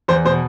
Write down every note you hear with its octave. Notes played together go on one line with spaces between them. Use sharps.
E2 C5
B2 C5